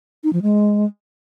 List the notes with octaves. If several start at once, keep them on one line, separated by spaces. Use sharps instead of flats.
D#4
F3
G#3